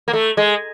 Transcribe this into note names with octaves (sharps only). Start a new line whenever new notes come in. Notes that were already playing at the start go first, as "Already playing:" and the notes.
A#3
A3
G#3